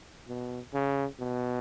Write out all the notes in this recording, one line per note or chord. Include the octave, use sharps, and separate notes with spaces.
B2
C#3
B2